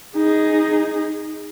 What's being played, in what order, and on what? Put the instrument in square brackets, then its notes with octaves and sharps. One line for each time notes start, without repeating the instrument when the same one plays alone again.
[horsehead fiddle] D#4 G#4